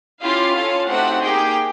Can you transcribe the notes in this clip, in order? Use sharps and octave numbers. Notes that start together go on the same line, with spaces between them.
C#4 E4 F4 G4 F5
C#4 F4 A4
A3 C4 D#4 F#4 G4 F#5
A#3 D#4 G4 G#4 G5